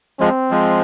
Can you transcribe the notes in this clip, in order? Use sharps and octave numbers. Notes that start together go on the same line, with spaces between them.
F3 G#3 C4
F3 G#3